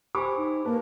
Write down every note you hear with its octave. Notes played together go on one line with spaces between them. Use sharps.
G4 C5 G#5 B5 C#6 D6
D#4
A#3 B4 A5